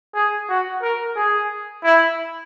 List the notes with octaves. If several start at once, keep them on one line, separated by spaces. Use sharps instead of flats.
G#4
F#4
A#4
G#4
E4